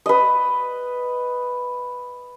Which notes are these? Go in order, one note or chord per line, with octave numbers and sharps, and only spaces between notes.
B4 D#5